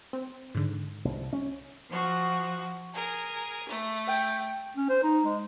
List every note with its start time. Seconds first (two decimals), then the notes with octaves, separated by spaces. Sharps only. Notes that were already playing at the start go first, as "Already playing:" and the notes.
0.13 C4
0.55 G#2 D3
1.05 C2
1.33 C#4
1.89 F3 F#4
2.93 G#4 A#4
3.68 A3
4.07 G5
4.77 C#4
4.89 C5
5.04 D#4
5.24 G#3